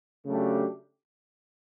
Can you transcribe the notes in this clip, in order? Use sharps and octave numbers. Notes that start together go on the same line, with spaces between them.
C#3 F#3 A3 D4 G4